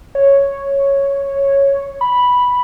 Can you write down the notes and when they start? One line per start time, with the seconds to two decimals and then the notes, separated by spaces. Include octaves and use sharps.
0.15 C#5
2.01 B5